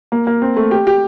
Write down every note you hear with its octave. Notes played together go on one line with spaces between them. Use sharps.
A#3
A#3
C4
A3
G4
G4